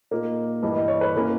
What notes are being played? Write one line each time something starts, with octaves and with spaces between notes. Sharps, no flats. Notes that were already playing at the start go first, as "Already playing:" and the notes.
A#2 A#3 D#4
G2 E3 G3 D#5
D#5
C#5
B4
E3 A#3 C#4